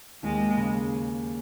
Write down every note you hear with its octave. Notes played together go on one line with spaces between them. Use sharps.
D#2 G#3
C#3